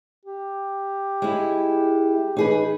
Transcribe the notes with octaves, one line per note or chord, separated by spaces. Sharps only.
G4
G#3 E4
E3 D#4 G#4 B4